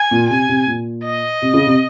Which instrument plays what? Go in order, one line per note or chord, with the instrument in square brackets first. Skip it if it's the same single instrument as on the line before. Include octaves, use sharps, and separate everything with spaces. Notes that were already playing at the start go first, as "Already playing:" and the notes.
Already playing: [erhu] G#5
[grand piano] A#2
[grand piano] C3 [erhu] G#5
[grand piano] C3
A#2
[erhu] D#5
[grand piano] C3
C#3
C3